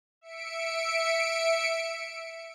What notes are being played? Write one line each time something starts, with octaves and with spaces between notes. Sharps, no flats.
E5 C#7 D7